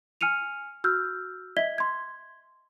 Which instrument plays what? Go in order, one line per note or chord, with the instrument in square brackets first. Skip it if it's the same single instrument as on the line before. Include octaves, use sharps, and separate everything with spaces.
[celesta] G#5 F6 C#7 D#7 F7
F#4 E6 F6 G6
D#5 E5 G#6 B6 G7
C6 G#6